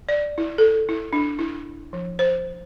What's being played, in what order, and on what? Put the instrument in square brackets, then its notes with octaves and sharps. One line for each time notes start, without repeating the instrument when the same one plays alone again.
[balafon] D5
E4
A4
E4
D4
E4
F3
C5